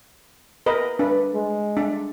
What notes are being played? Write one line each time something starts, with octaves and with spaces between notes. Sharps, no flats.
A#4 B4 D#5
D4 B4
G#3
D4